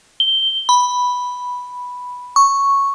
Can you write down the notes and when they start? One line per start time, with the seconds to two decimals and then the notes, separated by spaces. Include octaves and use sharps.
0.20 G7
0.69 B5
2.36 C#6